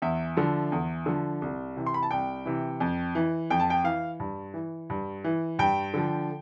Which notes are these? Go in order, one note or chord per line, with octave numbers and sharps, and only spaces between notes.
E2 E5
D3 F3
E2
D3 F3
C2
C3 E3
C6
B5
A5
C2 G5
C3 E3
F2
E3
F2 G5
A5
G5
E3 F5
G2
E3
G2
E3
G2 G5
D3 F3